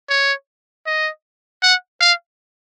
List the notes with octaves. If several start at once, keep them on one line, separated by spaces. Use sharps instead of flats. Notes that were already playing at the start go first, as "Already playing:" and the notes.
C#5
D#5
F#5
F5